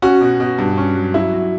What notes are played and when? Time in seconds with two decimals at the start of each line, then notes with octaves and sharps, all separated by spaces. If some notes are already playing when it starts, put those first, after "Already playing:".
0.02 C#4 F#4
0.21 B2
0.40 B2
0.58 G2
0.78 C#4
0.96 F#3
1.14 F#3 E4
1.33 F#3